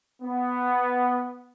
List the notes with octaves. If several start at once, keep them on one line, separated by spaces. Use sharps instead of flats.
B3